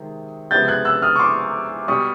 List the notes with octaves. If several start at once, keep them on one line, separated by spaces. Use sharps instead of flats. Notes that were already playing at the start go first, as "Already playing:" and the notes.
Already playing: C3 D#3 G#3
C#2 C3 F3 G#3 B3 G6 A6
F#6 G#6
E6 F#6
D#6 F6
C#6
C6 D6
B2 G3 C#6 D#6